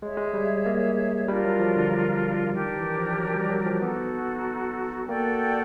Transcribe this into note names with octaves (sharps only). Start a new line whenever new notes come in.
G#3 G#4 C#5 E5
G#3
G3
A#3
G3 D4 F4 A#4
F#3
F3
D3
D#3 D4 G4 A#4
E3
F3
F#3
G3
F#3
F3
B3 D#4 F#4 A4
A#3 F#4 A4 D5 G5